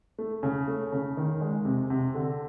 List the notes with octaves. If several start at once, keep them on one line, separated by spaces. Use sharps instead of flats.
A3
C#3
A3
C#3
D#3
G#3
C3
C3
D3